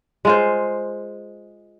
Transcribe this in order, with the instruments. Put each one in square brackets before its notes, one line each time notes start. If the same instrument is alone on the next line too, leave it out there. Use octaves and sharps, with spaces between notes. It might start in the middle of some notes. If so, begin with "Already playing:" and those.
[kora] G#3 F4 C5